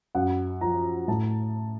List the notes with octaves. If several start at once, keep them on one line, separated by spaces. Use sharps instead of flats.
F#2 F#5
F3 A#5
A2 A5